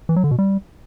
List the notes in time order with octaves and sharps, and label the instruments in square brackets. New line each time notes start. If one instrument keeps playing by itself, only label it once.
[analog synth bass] E3
F#3
D3
B2
G3